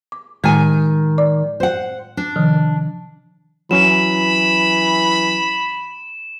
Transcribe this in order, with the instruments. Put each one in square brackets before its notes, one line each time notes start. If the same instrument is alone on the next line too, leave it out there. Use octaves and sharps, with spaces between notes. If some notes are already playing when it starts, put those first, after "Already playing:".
[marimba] D6
[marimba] A2 G#3 [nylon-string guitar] D#3 G#5
[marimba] D5 D6
[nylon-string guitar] C5 F#5
D4
[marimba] C3 D#3 F3
[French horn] E3 [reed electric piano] F#3 C#4 [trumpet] B5 [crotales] E7